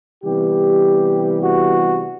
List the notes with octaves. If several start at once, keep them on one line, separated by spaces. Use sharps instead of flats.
C3 E3 G3 B3 G4
F#4